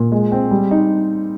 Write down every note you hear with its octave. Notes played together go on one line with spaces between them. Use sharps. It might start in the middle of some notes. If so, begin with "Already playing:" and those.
Already playing: A#2
G#3
C4
G3
D#4